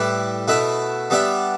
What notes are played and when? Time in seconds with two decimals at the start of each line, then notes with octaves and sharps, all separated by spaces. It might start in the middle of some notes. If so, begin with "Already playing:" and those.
Already playing: A2 G3 E4 G4 B4
0.48 B2 A3 E4 B4 E5
1.10 G3 B3 D4 G4 E5